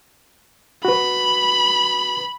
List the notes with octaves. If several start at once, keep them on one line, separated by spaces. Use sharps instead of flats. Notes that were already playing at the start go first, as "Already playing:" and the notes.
F#4 B4 B5